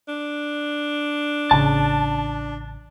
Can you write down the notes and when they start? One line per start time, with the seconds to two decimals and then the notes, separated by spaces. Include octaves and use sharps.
0.08 D4
1.51 A1 C#3 A5